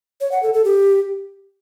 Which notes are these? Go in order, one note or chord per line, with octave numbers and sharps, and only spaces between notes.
C#5
F#5
A4
A4
G4